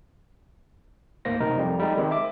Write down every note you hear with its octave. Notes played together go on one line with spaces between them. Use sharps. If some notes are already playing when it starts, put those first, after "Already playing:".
D2 G#2 A#3 C5 A#6
B1 C3 D#4 A#4
F2 G3 C4
G3 G#3 D#4 A4
D#3 G#3 C4 G4
E5 D6